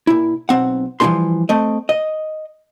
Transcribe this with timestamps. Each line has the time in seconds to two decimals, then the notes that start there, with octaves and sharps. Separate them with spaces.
0.07 A#2 E4
0.49 B1 C4 F#5
1.00 E3 F3 G3 D4 G#4 C6
1.49 A3 C4 D#5
1.89 D#5